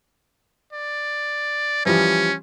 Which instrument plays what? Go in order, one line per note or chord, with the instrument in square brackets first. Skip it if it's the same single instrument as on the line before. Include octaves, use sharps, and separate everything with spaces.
[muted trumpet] D5
[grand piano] E3 F3 G3 [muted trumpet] C#4